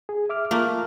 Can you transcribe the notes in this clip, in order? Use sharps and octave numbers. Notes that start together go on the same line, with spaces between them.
G#4
E5 D6 F6
A3 A#3 F4 F6